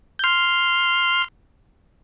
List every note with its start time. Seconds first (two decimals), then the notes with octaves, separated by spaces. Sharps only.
0.19 G6
0.24 C6 F6